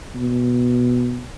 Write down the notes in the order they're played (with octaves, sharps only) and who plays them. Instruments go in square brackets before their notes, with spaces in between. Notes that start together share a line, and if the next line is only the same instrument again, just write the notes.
[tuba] B2